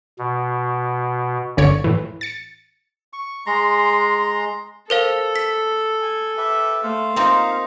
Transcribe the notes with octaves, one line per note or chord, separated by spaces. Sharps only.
B2
G1 C#2 D3 C#5 D5 C#7
A2 E3
A6 C#7
C#6
G#3 A#5 C6
A4 A#4 C5 F5
B6
G#5
G4 B4 E5
A3 C5 F5
A#3 C4 D#4 F4